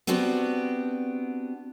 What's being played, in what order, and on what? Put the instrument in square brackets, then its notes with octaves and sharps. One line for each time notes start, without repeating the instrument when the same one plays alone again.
[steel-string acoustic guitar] B3 C4 D4 F#4 G4